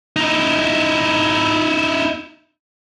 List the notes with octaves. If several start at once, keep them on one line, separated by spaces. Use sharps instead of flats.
D#4 E4